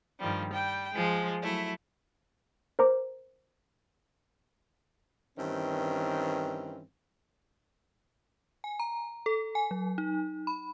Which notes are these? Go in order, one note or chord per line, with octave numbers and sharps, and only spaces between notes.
G2 D#3 F3 G3
G3 G5
F3 G#3
F#3 A3 E4
A#4 C5 A#5 D6
G2 D#3 E3 C4 C#4
G#5
A#5
A4
G#5
F#3
D#4
B5